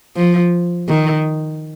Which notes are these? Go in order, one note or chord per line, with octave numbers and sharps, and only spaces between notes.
F3
D#3